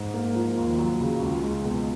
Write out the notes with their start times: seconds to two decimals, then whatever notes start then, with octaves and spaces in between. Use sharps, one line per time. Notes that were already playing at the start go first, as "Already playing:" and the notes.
Already playing: G#2
0.14 A#3
0.35 F3
0.57 D#2
0.78 F#3
1.01 C#3
1.22 C#2
1.43 G#3
1.65 B2